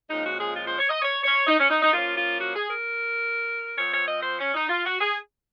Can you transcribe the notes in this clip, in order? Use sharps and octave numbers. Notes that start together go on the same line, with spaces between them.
A#2 F3 G#3 C#4 D#4
F#4
G#4
F4
C5
C#5
D#5
C#5
C#5
D#4
C#4
D#4
D#4
F3 A#3 C#4 F4
F4
F#4
G#4
A#4
F3 C4 C#5
C#5
D#5
C5
C#4
D#4
F4
F#4
G#4